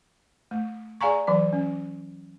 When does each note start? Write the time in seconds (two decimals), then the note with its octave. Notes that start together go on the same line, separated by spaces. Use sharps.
0.51 A3
1.01 G#4 D5 F5 G#5 A#5 C#6
1.27 E3 F#3 D5
1.53 C#4